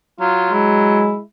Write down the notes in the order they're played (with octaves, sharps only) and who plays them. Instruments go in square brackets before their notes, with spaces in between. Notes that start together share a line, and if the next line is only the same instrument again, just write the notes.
[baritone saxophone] F#3 [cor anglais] F4
[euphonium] G#3 [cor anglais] E4